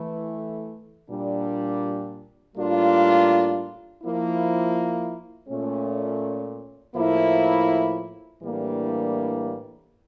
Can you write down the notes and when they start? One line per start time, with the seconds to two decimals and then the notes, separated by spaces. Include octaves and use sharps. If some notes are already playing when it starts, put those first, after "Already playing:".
Already playing: E3 A3 E4
1.10 A#2 G3 D4
2.56 A2 G3 A#3 D4 F4
4.03 F3 A#3 E4
5.48 A#2 A3 C#4
6.95 A2 F3 A#3 E4
8.42 A2 E3 G3 A#3 D4